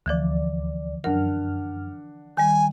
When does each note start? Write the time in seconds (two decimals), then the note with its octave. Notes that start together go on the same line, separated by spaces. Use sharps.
0.06 D2 D3 E3 F3 D5
1.04 F#2 D4 A#4 F#5 F6
2.37 D#3 G3 G5 G#5